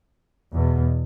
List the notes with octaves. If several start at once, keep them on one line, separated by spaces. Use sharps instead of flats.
E2 B2